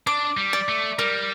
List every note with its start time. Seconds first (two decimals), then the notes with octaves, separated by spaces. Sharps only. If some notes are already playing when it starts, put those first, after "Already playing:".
0.07 D4 D6
0.37 G3
0.53 D5
0.69 A3
0.99 G3 A#4